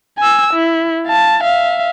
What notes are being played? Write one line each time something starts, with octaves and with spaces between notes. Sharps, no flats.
G#5 E6
E4
F5 A5
E5 F5